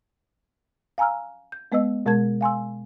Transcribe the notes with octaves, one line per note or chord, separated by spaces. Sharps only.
F5 G#5 A#5 E6 F6
G6
G#3 B3 B4 D#5 E6
B2 G#3 A#4 A5 G#6
F5 G#5 C6 E6